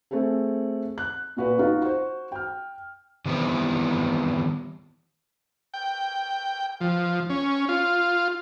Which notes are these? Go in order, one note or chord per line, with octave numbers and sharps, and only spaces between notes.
A3 C4 G#4 A4
F#6
A#2 F#4 B4
D#4 F4 F#4
F#4 C5
G5 F6
D#3 E3 G3 B3 C4 E4
G5
F3
C#4
F4